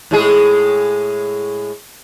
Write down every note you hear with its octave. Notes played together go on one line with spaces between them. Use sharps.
A2 G#3 G#4